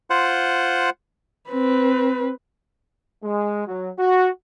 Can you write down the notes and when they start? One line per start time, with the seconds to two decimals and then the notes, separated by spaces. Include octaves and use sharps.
0.10 F4 C5 F#5
1.50 C4 B4
3.24 G#3
3.67 F#3
3.99 F#4